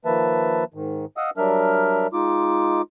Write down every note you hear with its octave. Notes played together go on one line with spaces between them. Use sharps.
D#3 F3 A#3 B4 E5 A5
G#2 D#3
D#5 F5 F#5 D#6 E6
F#3 G3 D4 A#4 E5 F6
G#3 D#4 F4 D6